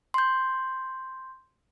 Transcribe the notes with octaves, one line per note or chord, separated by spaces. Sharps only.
C6 G6